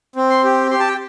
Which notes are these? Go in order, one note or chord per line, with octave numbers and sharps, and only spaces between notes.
C4
C6
G4
G4 C6
A5
G5